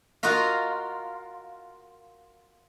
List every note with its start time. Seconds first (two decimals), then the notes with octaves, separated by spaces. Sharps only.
0.23 F4 F#4 A#4 D#5 F5